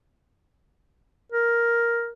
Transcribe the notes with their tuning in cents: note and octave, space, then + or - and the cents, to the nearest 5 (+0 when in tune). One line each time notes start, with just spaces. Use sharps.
A#4 +5